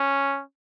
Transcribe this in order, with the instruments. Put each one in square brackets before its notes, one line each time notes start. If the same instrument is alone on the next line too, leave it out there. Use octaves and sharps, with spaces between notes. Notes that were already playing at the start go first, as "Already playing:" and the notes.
Already playing: [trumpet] C#4